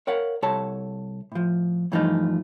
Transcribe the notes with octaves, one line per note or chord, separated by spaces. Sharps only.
A#4 C#5 F5 F#5
C2 A4 C#5 A5
A2 F3
G2 E3 F3 A3 D#4 F4